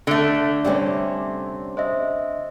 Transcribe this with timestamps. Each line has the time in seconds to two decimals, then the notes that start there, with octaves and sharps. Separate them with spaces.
0.07 D3 A3
0.65 C3 G3 C#4 D5 E5
1.77 C5 D#5 E5